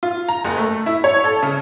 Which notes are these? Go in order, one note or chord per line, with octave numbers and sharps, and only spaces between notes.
F4
A#5
F#1
A3
E4
C#5
A4
C#3